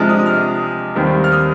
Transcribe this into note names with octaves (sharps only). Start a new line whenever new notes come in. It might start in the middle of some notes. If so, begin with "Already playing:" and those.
Already playing: C3 F3 G#3 D4 F6
D#6
D#6
F6
D#2 D#3 G3 C4
F6
D#6